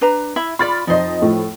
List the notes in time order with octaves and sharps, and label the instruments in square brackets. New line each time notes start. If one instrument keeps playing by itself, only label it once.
[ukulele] D4 B4 A#5
E4 E5 B5
[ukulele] F4 D5 [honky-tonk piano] B5 F6 A6
[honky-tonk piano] F2 D#5 [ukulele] D#4 C5
[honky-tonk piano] A2 F3